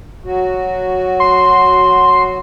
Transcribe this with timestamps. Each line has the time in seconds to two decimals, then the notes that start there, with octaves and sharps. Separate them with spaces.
0.24 F#3 F#4
1.20 C6